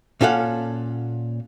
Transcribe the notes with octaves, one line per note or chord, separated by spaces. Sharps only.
A#2 C#4 A4 F5 F#5